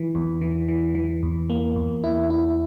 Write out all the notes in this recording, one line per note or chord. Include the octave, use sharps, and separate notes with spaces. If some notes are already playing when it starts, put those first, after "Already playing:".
Already playing: E3
E2
E3
E3
E3
E2
A#3
E2
E4
E4